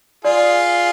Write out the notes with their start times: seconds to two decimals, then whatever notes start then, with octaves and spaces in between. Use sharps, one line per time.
0.24 F4 G#4 D5